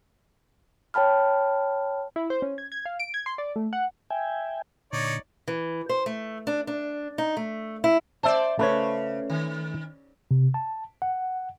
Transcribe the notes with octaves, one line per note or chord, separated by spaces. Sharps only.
C#5 G5 A5 B5 F6
E4
C5
C#4
G#6
G#6
F5
D7
G#6
C6
D5
A3
F#5
E5 G5 G#5
A#2 D3 D#4 C#5 D5
E3
C5
A3
D4
D4
D#4
A3
E4
C5 D5 E5 A5
C#3 A3 B4 C#5
D#3
C3
A5
F#5